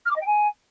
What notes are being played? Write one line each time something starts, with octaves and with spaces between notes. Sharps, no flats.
F6
D6
D#5
G5
G#5